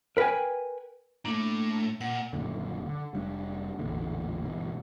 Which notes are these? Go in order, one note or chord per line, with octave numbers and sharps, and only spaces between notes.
A#4 B4 E5 G5 G#5
A2 A3 A#3 D4
A#2 F#5
D#1 F#2 A#2 D3
D3
F1 G3 C#4 D4
A1 E2 A#2 D3
G1 B2 E3